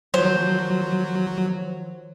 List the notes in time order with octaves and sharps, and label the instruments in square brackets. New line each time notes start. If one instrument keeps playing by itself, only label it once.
[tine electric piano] D#3 F3 C#5 [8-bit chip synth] F#3 [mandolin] C5